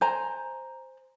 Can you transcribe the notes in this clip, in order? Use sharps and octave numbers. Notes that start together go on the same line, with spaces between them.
C5 G#5 A#5